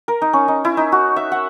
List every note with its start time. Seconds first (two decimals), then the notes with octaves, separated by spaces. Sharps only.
0.08 A#4
0.22 D#4
0.33 C#4
0.48 D#4
0.65 E4
0.77 D#4
0.92 F#4
1.16 E5
1.32 F#5